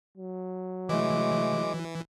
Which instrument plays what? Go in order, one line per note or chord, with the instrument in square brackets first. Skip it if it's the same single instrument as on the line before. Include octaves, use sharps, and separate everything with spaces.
[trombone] F#3
[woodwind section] C3 A3 [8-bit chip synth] E3 [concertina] G#3 D6